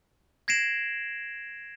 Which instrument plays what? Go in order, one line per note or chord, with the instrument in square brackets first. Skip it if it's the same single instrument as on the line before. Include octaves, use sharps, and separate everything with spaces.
[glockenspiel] G#6 A#6 C7 D7 E7 F#7